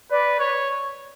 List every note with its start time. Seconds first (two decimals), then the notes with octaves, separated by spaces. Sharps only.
0.11 B4 D5
0.39 C#5